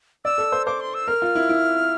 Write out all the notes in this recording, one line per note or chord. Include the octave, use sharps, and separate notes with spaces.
D5 E6
A4
C5
C5 D6
C6
E6
A#4 F6
F4
E4
E4